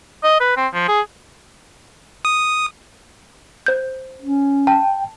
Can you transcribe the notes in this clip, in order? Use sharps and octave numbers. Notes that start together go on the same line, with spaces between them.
D#5
B4
C4
F3
G#4
D#6
C5 G6
C#4
G5 A5